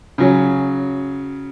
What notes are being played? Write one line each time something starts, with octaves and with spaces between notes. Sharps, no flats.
C#3 F#3 C#4